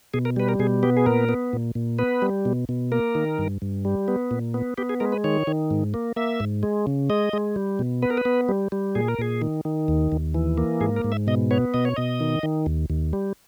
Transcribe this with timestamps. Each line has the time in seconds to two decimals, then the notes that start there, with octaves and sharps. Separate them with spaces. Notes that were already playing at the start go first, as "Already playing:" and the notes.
0.14 B2 G#4
0.25 A#4
0.36 G3 B4
0.49 A#4
0.59 B2 G#4
0.83 B3 G4
0.97 G#4
1.06 A#2 A#4
1.29 B3
1.53 A#2
1.75 A#2
1.99 B3 B4
2.22 G3
2.45 B2
2.69 B2
2.92 A#3 A#4
3.15 D#3
3.38 G2
3.62 G2
3.85 G3
4.08 B3
4.31 A#2
4.54 B3
4.78 B3 G4
4.89 G#4
5.00 G#3 A#4
5.12 B4
5.24 D#3 C#5
5.47 D#3
5.71 G#2
5.94 A#3
6.16 A#3 E5
6.40 G#2
6.63 G#3
6.87 C#3
7.10 G#3 D#5
7.33 G#3
7.56 G3
7.79 B2
8.02 B3 B4
8.10 A#4
8.17 B4
8.25 B3
8.49 G3
8.72 G3
8.95 A#2 G#4
9.08 A#4
9.19 A#2 G#4
9.42 D#3
9.65 D#3
9.88 D#2
10.12 D#2
10.34 E3
10.58 A#3
10.81 G#2 G#4
10.96 A#4
11.04 G#2
11.12 E5
11.27 B2 D#5
11.51 B3 C#5
11.74 B2 D#5
11.85 C#5
11.96 B2 D#5
12.20 D#3
12.43 D#3
12.66 D#2
12.90 D#2
13.13 G3